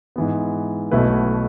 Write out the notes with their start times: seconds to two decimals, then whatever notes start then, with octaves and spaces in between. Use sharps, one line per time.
0.16 G#2 E3 B3
0.91 B1 B2 A3 E4 B4